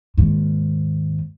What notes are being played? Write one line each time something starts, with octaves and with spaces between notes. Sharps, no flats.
D#2 G#2